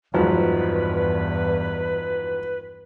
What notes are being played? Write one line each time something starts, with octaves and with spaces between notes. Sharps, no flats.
G#1 E2 G2 F3 F#3 B4